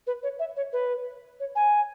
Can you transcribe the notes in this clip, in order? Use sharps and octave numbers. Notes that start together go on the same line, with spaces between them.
B4
C#5
E5
C#5
B4
C#5
G#5